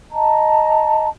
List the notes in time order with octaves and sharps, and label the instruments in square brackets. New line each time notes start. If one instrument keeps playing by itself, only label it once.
[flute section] D#5 A5 A#5